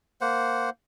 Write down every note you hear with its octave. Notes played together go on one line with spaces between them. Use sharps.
A#3 C5 F#5